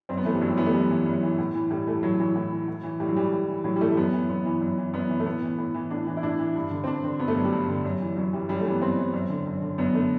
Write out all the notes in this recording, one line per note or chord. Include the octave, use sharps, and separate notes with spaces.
F#2 C4
B3
E3 A3
G3
F#2 F#3
G3
E3 B3
A3
F#2 G3
E3
F#2
E3
A2
E3
A2 G3
E3 A3
A2 F#3
E3 F#3
A2
E3
A2
E3
A2 G3
F#3
E3 G3
A2
E3
A2 F#3
G3
E3 A3
A3
F#2 B3
E3
F#2 B3
E3
F#2
E3
F#2 B3
E3
A3
A2 B3
E3
A2
E3
A2 D4
E3
E4
A2 D4
E3
G2
D3
C4
G2 D4
D3 C4
G2 B3
A3
D3 F#3
G3
G2
D3
F#2
E3
F#2 F#3
E3 G3
F#2 G3
E3 A3
B3
F#2 C4
E3
F#2
D3
F#2
D3
F#2 B3
D3 A3